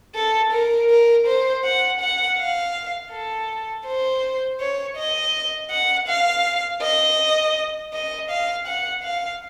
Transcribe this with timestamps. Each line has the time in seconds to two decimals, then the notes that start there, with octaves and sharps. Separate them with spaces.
0.15 A4
0.52 A#4
0.90 A#4
1.27 C5
1.64 F#5
2.00 F#5
2.38 F5
3.12 A4
3.86 C5
4.60 C#5
4.97 D#5
5.71 F#5
6.08 F5
6.82 D#5
7.94 D#5
8.30 F5
8.67 F#5
9.04 F5